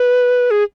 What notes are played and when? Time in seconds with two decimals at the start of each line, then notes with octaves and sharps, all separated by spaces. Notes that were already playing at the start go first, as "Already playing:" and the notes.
Already playing: B4
0.51 G#4